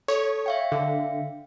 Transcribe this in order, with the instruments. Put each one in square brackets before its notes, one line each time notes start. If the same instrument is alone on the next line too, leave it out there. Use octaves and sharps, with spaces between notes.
[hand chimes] A4 [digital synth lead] C#5
[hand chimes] E5 F5 G5
[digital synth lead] D3